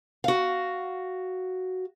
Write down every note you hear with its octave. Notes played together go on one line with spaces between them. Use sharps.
F#4 F5